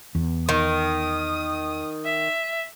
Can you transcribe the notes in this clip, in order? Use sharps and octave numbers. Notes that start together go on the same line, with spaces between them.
E2
D#3 D#6
E5